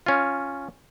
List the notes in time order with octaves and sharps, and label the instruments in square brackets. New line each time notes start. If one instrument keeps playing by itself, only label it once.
[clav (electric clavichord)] C#4 F4